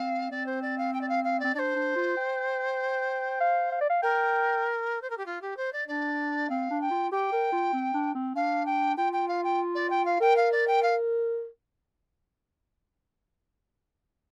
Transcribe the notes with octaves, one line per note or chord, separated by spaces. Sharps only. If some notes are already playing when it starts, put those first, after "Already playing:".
Already playing: C4 F5
C4 D5
C5
D5
F5
G5
D5
F5
F5
C4 D5
D4 C5 D5
D4
F4
G5
F5
F5
D5
F5
A#4 G5
C5
A#4
G4
F4
G4
C5
D5
D4 D5
C4 F5
D4
G5
F4
G4 G5
A#4
F4
C4
D4
C4
D4 F5
G5
F4 G5
G5
F5
G5
D5
G5
F5
A#4 G5
F5
D5
G5
F5